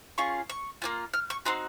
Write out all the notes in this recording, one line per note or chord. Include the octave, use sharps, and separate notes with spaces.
C#4 F4 G#4 C#6
C#6
A#3 C#4 F4
F6
C#6
C4 D#4 F#4 C6